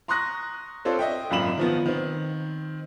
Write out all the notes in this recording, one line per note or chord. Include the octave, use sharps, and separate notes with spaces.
A#5 C6 C#6 D#6 F#6 A#6
C4 D4 F4 A4 C5 C#5
D#5 E5 G5
G#1 F#2 A#2 B5 E7 F#7
D#3 F3 B3
D#3 C4